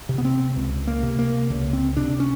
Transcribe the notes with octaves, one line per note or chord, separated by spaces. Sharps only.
C3
B3
C4
C#2
A#3
C3
A#3
C#2
C4
C3 D4
C#4